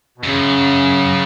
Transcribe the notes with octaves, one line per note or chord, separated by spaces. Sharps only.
B2
F#2 C#3